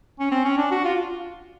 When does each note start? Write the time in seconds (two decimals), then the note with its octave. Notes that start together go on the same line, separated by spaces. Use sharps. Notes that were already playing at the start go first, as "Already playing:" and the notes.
0.19 C#4
0.31 C4
0.45 C#4
0.58 D4
0.71 F#4
0.84 F4